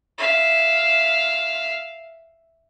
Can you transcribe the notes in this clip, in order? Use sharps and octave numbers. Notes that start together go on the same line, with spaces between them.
E5 F5